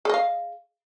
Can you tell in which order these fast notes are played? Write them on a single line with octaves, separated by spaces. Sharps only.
G#4 D#5 F5